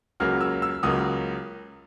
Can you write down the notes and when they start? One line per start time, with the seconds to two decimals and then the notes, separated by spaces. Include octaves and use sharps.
0.20 C#2 C#3 F#3 A#3 F6
0.41 E6
0.62 E6
0.83 C#2 C#3 F#3 A#3 D#6